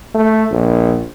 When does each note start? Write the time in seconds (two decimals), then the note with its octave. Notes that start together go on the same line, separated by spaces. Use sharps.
0.14 A3
0.51 A#1